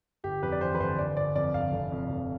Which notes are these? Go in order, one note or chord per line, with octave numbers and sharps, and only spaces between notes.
G1 G4
F2 B4
D5
E3 C5
B4
G1 C5
G1 D5
G1 D5
F2 D5
G1 F5
F1
F2
F1